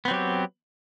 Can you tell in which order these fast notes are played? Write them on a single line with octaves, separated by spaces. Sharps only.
B3 C4 F#3 G4